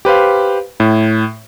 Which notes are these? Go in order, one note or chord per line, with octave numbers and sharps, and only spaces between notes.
G4 B4 C5 F5
A2